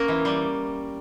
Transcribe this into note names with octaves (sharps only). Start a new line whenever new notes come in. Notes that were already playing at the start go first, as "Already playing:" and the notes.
Already playing: A#3 C#4 A#4
E3
G3